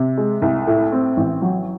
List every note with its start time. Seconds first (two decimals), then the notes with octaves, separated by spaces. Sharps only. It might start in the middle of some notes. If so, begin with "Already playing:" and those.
Already playing: C3
0.18 G#3
0.42 C2
0.67 A2
0.92 C4
1.17 A1
1.42 F#3